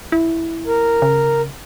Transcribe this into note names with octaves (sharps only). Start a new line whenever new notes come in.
E4
A#4
C#3